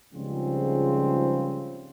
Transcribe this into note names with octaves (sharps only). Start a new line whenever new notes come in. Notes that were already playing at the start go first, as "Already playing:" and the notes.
C#2 G#2 C#3 F3 G3 C4